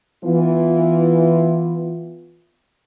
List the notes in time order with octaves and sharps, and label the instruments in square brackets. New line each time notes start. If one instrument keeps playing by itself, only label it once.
[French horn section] E3 B3 F4